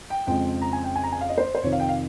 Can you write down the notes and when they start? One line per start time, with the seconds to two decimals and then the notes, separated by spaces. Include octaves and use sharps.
0.10 G5
0.27 F2 C#3 G#3 C4 G5
0.62 A#5
0.73 G#5
0.84 G5
0.96 G#5
1.04 A#5
1.12 G#5
1.21 F5
1.29 D#5
1.38 C5
1.55 C5
1.63 F2 C3 D#3 C#5
1.72 F5
1.80 G5
1.89 F5